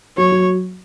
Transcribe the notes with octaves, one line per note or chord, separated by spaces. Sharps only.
F#3 C#5
F#3